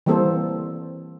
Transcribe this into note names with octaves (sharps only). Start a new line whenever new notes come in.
E3 G3 A#3 C4 A4 C5